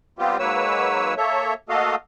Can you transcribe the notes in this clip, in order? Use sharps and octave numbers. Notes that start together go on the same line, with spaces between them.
G3 B3 C4 F4 G4
G#2 F#3 A#3 B4 C#5 E6
A#3 A4 C#5 E5
A3 A#3 F#4 A4 D#5 F5